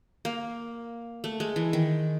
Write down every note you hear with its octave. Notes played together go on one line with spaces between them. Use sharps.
A#3
A3
G#3
E3
D#3